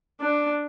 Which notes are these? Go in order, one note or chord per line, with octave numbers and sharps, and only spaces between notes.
D4